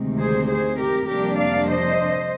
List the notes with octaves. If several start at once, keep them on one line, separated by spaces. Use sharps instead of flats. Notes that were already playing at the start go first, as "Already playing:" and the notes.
Already playing: D2 C3 D#3 G#3 C4
G#4 C5
G#4 C5
G4 A#4
F2 C3 G3 A#3 D4 G4 A#4
D5 F5
C5 D#5